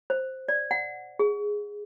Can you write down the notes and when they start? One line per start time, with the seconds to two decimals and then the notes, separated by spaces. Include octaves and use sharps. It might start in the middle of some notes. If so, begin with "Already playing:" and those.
0.10 C5
0.49 D5
0.71 F#5
1.19 G#4